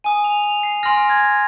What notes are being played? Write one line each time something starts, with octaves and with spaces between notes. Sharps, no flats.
G#5 D#6 D#7
F7
F7
C7
G#5 C6 F6 A#6
G#6